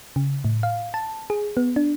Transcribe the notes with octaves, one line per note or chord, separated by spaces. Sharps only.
C#3
A2
F5
A5
G#4
B3
D4